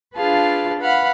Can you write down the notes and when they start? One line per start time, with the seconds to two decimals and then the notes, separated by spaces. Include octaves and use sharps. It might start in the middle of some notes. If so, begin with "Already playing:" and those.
0.16 D4 F4 G#4 B4 F5 A5
0.80 B4 F5 F#5 B5